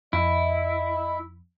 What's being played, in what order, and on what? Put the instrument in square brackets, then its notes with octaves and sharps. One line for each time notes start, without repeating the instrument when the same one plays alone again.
[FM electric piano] F2 [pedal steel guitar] E4 [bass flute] D#5